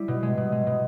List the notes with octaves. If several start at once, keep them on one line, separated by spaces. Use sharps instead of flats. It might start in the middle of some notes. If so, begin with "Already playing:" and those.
Already playing: G3 E4
B2
G#3
B2
G#3
B2